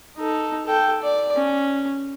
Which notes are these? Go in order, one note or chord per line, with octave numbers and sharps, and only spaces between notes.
D#4 A4
A4 G5
D5
C#4